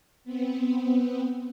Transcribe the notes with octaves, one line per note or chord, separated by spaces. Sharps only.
B3 C4